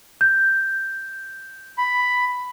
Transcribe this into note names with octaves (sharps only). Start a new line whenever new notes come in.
G6
B5